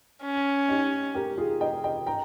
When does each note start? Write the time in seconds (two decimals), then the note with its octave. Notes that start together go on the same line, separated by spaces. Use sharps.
0.23 C#4
0.68 D#4 G4
1.15 G4 A#4
1.38 F4 G#4
1.61 D#5 G5
1.84 D#5 G5
2.06 G5 A#5